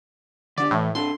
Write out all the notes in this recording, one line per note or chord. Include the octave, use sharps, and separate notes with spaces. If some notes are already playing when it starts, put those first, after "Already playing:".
D3 D4 G4 D5
A2 E3 A3
C4 D4 A4 C6